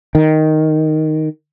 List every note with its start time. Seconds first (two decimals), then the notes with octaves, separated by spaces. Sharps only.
0.15 D#3